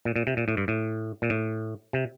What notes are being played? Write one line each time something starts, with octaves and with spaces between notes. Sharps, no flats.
A#2
A#2
C3
A#2
A2
G2
A2
A#2
A2
C3